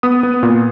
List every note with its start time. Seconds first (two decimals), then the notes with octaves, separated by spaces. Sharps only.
0.03 B3 D#6
0.23 B3
0.43 A#2